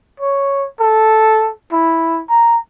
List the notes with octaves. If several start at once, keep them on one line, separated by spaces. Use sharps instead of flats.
C#5
A4
E4
A#5